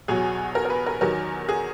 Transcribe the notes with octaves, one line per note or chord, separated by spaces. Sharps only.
E2 B2 F#3 G#4
A#4
A#4
B4
A#4
E2 D#3 F#3 A#4
G#4